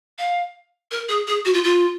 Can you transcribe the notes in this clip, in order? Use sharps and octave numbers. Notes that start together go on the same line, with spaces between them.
F5
A#4
G#4
G#4
F#4
F4
F4